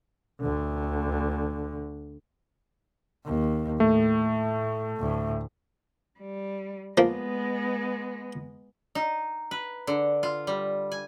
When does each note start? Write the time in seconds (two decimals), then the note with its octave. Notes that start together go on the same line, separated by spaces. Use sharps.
0.42 D2 D3
3.26 D#2
3.80 A2 A3
5.00 D2 A2
6.19 G3
6.98 F3 G#3 A#3 B3
8.95 D#4
9.51 B4
9.87 D3
10.23 F4
10.47 G3
10.92 G#5